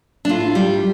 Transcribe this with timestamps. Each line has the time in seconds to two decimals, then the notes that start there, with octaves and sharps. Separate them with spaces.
0.25 D4
0.29 A2 F4
0.55 G3